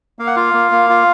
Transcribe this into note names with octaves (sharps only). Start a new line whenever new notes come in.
A#3 F5
F#5
F4 F5
A#3
A#3
F4